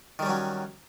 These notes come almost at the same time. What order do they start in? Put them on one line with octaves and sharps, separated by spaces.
D#3 G3 C#4 F#3